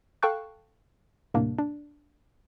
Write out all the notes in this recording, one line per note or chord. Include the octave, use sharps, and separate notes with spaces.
A4 F5 G5 A5 C#6 F#6
D#2 A2 C3 G3 A#3 D4
D4